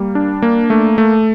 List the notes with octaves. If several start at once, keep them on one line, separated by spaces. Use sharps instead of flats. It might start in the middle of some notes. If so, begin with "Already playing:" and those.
Already playing: G3 A#3
D4
A#3
A3
A3